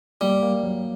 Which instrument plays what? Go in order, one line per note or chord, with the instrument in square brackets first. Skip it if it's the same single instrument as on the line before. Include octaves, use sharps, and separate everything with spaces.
[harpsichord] G3 [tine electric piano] A#3
[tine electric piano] A#3
F#3